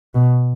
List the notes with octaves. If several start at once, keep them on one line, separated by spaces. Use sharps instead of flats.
B2